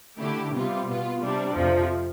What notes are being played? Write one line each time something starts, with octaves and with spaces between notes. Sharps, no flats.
D3 A3 E4 G4
C3 G3 B3 F4
B2 B3 F4
C3 G3 D4
F2 C3 F3